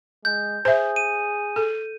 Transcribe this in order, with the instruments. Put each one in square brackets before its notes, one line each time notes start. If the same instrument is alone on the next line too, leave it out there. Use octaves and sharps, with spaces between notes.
[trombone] G#3 [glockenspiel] G6
[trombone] G#4 [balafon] C5 E5
[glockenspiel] D#7
[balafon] A4